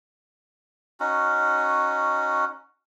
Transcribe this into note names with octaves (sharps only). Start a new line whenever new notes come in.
C#4 D#4 F#4